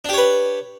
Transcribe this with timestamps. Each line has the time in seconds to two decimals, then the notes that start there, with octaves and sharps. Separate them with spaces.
0.05 D4
0.09 G4
0.13 C#5
0.18 B4